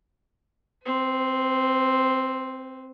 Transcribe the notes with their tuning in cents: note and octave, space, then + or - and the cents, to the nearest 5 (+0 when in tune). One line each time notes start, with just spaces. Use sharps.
C4 +0 B4 +45